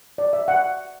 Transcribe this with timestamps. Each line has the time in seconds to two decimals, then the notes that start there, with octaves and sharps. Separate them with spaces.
0.18 D5
0.33 E5
0.48 F#5